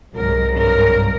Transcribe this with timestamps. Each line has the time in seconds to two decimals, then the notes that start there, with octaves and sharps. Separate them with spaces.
0.14 C2 G#2 F#3 A#4
0.53 G2 A#4